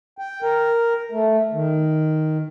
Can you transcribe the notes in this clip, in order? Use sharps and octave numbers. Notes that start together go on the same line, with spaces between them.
G5
A#4
A3
D#3